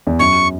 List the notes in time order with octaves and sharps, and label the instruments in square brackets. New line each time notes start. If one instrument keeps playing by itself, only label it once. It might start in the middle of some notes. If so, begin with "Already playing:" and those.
[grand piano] E2
[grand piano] F#2 [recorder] C#6